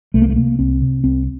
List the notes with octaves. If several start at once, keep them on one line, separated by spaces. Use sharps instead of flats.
C2 A3
A#3
A3
C3 A#3
C2 C4
C3
C2 C4